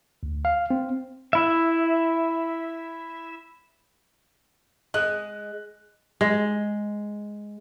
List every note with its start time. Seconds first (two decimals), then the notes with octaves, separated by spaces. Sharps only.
0.23 D2
0.45 F5
0.70 C4
1.33 E4 E5
4.94 G#3 D#5 F#6
6.21 G#3